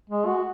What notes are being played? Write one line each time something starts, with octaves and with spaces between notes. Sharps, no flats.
G#3
F#4